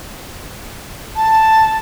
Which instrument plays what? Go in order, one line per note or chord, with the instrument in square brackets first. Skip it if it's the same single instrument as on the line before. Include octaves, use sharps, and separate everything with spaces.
[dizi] A5